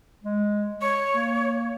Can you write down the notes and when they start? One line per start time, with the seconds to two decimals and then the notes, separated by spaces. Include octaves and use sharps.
0.24 G#3
0.82 C#5 C#6
1.15 A#3